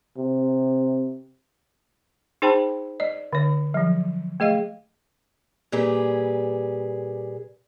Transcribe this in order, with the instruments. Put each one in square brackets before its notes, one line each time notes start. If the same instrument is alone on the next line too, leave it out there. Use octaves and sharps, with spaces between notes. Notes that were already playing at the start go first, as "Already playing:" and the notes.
[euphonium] C3
[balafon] D#4 G#4 C5 G5 A5 B5
D5 D#5
D3 C#5
F3 F#3
A3 G#4 D#5 F5
[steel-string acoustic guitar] A#2 G3 G#4 B4